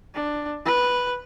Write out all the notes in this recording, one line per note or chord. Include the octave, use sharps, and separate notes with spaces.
D4
B4